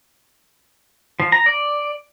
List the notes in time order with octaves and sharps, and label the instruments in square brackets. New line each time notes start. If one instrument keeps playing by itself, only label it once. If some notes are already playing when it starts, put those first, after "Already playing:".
[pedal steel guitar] F3
A#5
D5